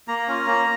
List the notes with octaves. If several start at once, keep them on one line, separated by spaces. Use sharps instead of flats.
A#3 A#5
C#4 F4
A#3